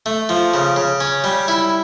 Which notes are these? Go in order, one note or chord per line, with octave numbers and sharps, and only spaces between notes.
A3
F3
C#3
C#3
C#4
G3
E4